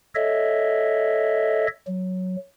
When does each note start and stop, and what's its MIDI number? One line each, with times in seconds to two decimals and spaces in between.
0.15 1.67 69
0.15 1.67 73
0.15 1.67 75
0.15 1.67 76
1.87 2.36 54